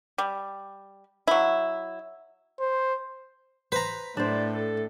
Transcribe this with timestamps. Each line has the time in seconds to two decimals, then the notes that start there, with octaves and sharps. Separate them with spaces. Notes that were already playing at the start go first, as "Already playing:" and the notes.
0.18 G3
1.28 F#3 E4
2.60 C5
3.72 B4 C5 A#5
4.17 A2 D4 C5 D5
4.54 A4